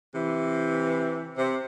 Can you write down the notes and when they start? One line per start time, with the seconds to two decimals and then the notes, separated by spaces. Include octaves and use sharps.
0.14 C3 E3
1.37 C3